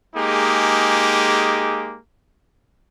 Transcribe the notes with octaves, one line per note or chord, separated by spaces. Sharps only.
G#3 A#3 D#4 G4 G#4